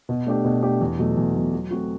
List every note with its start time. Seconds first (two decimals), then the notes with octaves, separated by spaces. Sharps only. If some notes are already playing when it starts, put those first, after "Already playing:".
0.09 B2
0.26 A3 D4 G4
0.45 B2
0.63 A3 D4 G4
0.81 E2
0.99 B2 F#3 A3
1.17 E2
1.34 B2 F#3 A3
1.53 F#3
1.71 A3 C4 F#4